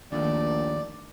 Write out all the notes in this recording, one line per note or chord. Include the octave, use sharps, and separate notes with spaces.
A#1 D#2 D#3 A3 D5